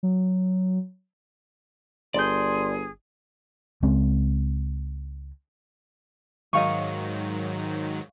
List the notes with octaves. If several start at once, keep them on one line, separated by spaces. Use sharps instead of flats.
F#3
G1 G#4 D5 C6 G6
C#2 G#3 C4
G#2 D#3 F#3 D#5 F5 C#6